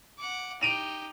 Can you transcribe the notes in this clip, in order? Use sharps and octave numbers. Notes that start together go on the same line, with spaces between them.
F#5 D6
D#4 G4 D7 D#7 F7